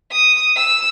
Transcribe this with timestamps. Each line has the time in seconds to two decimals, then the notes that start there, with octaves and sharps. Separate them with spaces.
0.12 D#6
0.57 E6